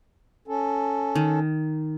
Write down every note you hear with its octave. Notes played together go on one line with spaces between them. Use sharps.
C#4 A4
D#3